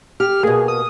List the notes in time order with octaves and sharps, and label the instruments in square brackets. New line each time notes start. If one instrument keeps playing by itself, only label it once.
[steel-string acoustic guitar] G4 [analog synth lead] F6
[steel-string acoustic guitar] B2 A#3 [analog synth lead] G#4
[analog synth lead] D#6